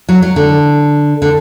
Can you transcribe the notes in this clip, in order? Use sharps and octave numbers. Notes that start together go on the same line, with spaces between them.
F#3
F#3
D3
D3